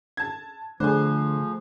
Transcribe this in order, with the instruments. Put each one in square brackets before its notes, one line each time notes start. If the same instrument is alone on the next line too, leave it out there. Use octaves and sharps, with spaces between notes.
[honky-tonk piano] A5 G#6
[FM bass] D3 [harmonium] F3 [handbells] A3 [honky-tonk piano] G#4 C5